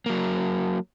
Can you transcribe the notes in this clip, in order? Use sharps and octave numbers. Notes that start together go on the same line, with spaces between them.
F#3 A#3